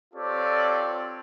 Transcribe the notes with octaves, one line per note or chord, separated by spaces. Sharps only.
C4 F4 G4 A4 C#5 D5